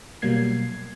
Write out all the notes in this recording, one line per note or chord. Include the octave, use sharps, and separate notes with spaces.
B2 F#3 G3 A#3 G#6 C7